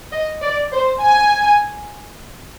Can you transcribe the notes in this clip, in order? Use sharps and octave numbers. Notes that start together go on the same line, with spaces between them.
D#5
D5
C5
G#5